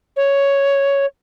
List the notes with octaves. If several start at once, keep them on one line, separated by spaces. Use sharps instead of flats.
C#5